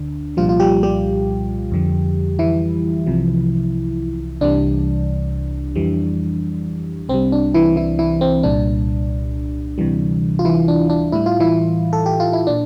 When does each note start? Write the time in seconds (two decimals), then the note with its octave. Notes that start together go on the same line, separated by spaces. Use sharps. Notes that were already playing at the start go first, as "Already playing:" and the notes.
Already playing: D2 D3 D4
0.37 C2 A#2 F3 G3 F4
0.49 F4
0.60 G3 G4
0.83 G3 G4
1.72 F2 D3 F3
2.39 E3 E4
3.07 C2 C3 F3
4.41 C2 C3 E3 G3 D4
5.76 F2 E3 G3
7.09 C2 C3 G3 C4
7.32 D4
7.54 E3 E4
7.76 E3 E4
7.99 E3 E4
8.21 C4
8.43 C2 A#2 G3 D4
9.78 D2 C3 E3 G3
10.39 F4
10.45 E3 E4
10.68 D4
10.90 D4
11.12 A2 G3 E4
11.26 F4
11.40 E3 E4
11.93 A4
12.06 G4
12.20 F4
12.33 E4
12.47 A#2 D4